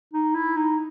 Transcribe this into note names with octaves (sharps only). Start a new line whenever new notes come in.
D#4
E4
D#4